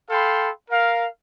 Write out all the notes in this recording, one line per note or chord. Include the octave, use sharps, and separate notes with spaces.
A4 F5 G5 B5 C6
A#4 F5